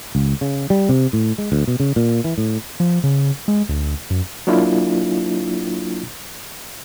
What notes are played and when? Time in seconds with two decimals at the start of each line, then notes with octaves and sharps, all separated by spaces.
0.15 C#2
0.41 C#3
0.70 G3
0.89 C3
1.13 A2
1.38 G#3
1.52 D2
1.67 B2
1.80 C#3
1.96 A#2
2.24 E3
2.38 A2
2.80 F3
3.04 C#3
3.48 G#3
3.69 D2
4.10 F#2
4.47 F#3 A#3 D4 E4 F4